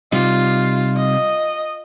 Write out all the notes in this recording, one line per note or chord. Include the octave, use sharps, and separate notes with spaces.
C3 G3 D#4 F4
D#5